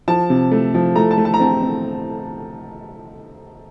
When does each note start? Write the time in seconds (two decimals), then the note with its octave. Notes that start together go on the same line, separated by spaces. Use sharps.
0.08 F3 A5
0.30 C3
0.51 A3
0.74 F3
0.96 A3 A#5
1.11 A5
1.17 A3
1.25 A5
1.34 A#5
1.40 C4 A5
1.62 C4